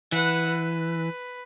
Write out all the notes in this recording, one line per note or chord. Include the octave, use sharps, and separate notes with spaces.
E3 B4 F#5
B4